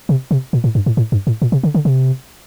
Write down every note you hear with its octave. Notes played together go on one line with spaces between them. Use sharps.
C3
C3
A#2
A2
G2
A2
A2
G2
A2
A#2
C3
D3
D3
C3